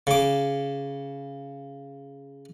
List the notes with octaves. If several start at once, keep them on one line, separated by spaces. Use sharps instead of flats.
C#3 D6